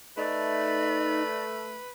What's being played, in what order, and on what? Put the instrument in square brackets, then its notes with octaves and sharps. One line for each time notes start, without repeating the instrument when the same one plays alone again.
[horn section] A3 [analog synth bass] D#4 [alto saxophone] B4 [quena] D5